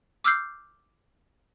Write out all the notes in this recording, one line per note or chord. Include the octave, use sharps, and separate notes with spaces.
D6 E6 F6 G6 C7